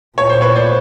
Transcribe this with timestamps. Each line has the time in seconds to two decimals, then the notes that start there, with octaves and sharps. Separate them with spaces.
0.18 A#2 C#5
0.30 C5
0.41 B4 C#5
0.56 C5 D5